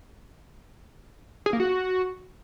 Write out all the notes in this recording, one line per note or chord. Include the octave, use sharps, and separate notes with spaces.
G#4
A#3
F#4